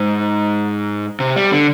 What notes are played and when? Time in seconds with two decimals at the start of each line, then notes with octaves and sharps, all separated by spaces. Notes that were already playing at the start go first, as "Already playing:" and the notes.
Already playing: G#2
1.20 C3
1.36 G3
1.52 D3